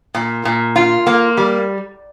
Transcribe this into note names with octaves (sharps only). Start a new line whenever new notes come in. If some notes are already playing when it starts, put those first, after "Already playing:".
A#2
A#2
F4
A#3
G3